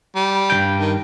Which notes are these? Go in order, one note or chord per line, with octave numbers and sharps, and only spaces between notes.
G3
G2 E3 G5
D#3